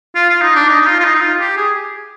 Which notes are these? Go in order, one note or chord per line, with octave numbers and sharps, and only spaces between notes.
F4
F4
D#4
D4
D#4
D#4
F4
F4
D#4
D#4
F4
G4
G#4